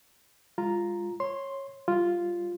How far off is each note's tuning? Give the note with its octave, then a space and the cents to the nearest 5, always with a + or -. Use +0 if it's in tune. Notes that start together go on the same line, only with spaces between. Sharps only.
G#3 -40 F4 +0 A#5 +0
C#5 -15 C6 +0
G3 +0 F4 +0